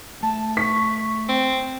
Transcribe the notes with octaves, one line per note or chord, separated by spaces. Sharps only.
A3 A5
C#6 B6
C4